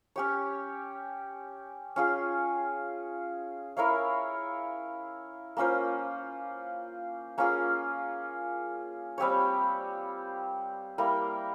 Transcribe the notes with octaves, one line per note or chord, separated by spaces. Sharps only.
C#4 G4 C#5
C#4 F4 G#4
E4 A#4 C#5 F5
A#3 C#4 F4 C5
A#3 C#4 F4 G#4
G3 C4 G4 C#5
G3 A#3 E4 A#4